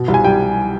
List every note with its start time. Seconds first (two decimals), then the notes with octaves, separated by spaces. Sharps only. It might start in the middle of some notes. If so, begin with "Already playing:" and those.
Already playing: B2
0.08 C2
0.14 G#5
0.24 G3 G5